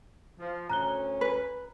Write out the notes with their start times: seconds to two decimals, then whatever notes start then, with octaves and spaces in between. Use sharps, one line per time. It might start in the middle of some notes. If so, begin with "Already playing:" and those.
0.39 F3
0.70 D2 C#4 A#5 F#6 G7
1.21 B4